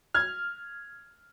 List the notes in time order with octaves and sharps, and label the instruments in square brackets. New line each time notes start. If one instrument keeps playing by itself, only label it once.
[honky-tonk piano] F6 G#6